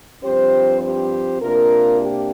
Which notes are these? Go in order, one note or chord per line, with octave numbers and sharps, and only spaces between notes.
G2 F3 C4 G4 C5
G4 C5
C3 A#3 D4 F4 A#4
G4